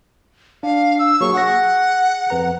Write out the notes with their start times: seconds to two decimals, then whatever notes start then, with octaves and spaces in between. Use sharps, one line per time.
0.63 D4 F5
0.99 E6
1.21 F#3 A#3 G#4 C#6
1.33 G#4 F#5 A#6
2.30 F2 B4 A#5